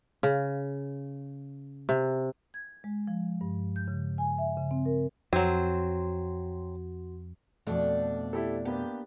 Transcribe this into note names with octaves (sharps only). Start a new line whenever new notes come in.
C#3
C3
G#6
G#3
F3
G2
G6
C#3
G#5
E5
C#3
C4
A#4
F2 F#3 C4 F#4
F2 B2 A3 D4
E4 G4 A4
A#3 B3 D4 G4